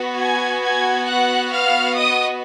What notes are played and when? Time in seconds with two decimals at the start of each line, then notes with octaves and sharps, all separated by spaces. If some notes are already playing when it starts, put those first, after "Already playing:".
Already playing: B3 F#4
0.17 G#5 G#6
0.62 G#5 G#6
1.08 F#5 F#6
1.52 F5 F6
1.97 D#5 D#6